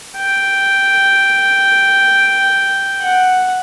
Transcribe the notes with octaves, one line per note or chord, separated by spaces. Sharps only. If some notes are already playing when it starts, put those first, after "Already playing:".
G5
F#5